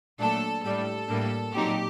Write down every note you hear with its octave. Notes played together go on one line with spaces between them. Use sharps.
A#2 F#3 A3 D4 A4
A2 G3 D4 A4
A2 G3 A#3 D4
A#2 F#3 C4 D#4 G4